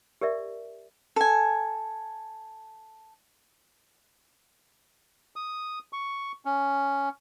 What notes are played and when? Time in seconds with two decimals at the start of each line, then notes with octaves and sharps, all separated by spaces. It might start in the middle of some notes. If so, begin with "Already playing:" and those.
0.21 G4 A#4 D5 E5
1.16 A4 G#5
5.36 D#6
5.93 C#6
6.45 C#4